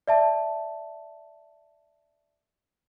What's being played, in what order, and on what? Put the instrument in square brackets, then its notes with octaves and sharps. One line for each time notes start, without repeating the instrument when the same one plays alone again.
[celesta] D5 E5 A5